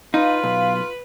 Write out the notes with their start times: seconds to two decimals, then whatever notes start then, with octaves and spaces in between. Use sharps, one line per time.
0.14 D#4 F4 B4 F5
0.43 B1